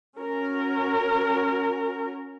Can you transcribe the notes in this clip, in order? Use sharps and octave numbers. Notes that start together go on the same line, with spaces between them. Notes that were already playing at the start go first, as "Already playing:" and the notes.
C#4 F#4 A#4